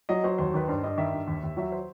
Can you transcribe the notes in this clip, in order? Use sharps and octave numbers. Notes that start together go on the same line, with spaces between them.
F#3 D#5
F#3 C5
D#2 C5
D#3 B4
G2 C5
G2 D#5
D#3 E5
G2
D#2
D#2
F#3 E5
C5